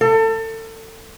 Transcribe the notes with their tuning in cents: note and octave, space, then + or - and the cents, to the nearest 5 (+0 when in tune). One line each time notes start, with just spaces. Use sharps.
A4 +30